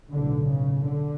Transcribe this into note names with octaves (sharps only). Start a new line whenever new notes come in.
B1 A2 D3
C#3
D3